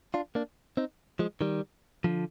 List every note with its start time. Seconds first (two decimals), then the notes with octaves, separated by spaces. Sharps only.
0.14 D4 F4
0.35 A#3 D4
0.77 C4 D#4
1.19 F3 G#3
1.41 D#3 G3
2.04 D3 F3